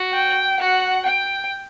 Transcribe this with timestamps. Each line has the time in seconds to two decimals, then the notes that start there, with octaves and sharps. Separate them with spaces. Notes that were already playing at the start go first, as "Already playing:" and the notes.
Already playing: F#4
0.14 G5
0.59 F#4 F#5
1.05 G5